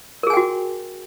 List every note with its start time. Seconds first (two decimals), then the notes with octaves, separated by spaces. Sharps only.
0.23 A#4
0.27 G#4
0.30 G#5
0.33 G5
0.37 F#4